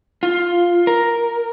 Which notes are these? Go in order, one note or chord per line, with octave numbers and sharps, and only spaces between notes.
F4
A#4